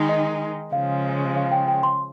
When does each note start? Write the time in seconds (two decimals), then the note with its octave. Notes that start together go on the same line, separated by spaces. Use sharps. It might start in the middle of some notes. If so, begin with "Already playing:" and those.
Already playing: D#3 G#3 D#4
0.09 D#5
0.72 C#3 F3 G#3 F5
1.36 F5
1.52 G5
1.68 G5
1.83 C6